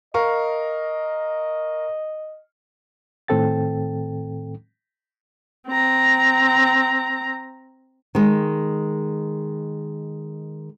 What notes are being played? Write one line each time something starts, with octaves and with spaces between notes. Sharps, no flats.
A#4 D#5 F5 C#6
A2 D#3 C4 A4 G5 A6
C4 A#5
D#3 G#3